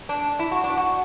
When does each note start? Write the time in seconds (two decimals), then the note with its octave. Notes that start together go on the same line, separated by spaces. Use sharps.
0.09 D4
0.39 E4
0.51 F#4
0.64 D4
0.77 F#4